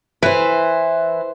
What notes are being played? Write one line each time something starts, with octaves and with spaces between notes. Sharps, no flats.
E3 B4 C5